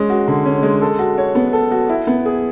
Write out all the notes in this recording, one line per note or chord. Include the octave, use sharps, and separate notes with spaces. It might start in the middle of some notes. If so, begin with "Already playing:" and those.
Already playing: G#3 C#4
F#4
D3
C#4
G#3
A4
F#4
C#5
B3
A4
F#4
E4
B3
G#4